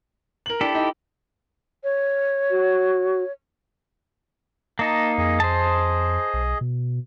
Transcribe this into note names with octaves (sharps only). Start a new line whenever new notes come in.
A#4 F#7
D4 E4 G4 A4
D#4
C#5
F#4
A#3 D#4 D#5 A5
F2 G#4 D#5
C5 A5
B1
B2